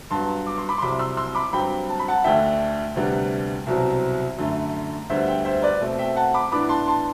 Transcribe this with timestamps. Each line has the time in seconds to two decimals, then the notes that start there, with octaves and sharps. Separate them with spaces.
0.11 G2 F#3 B3 A5 C6
0.47 D6
0.58 C6
0.69 B5 D6
0.78 C6
0.81 C2 C3 F#3 B5 D6
0.99 C6 E6
1.17 C6 E6
1.35 B5 D6
1.53 G2 F#3 C4 G5 B5
1.89 A5
1.99 B5
2.08 F#5 A5
2.24 D2 D3 A3 D4 E5 G5
2.96 D2 C3 G3 B3 D4
3.66 C2 B2 F#3 C4
4.38 F#2 D3 A3
5.10 D2 D3 G3 B3 C5 E5
5.27 E5 G5
5.45 C5 E5
5.62 B4 D5
5.81 B2 A3 C4
5.99 E5 G5
6.16 F#5 A5
6.34 B5 D6
6.52 A2 E3 B3 D4 B5 D6
6.69 A5 C6
6.88 A5 C6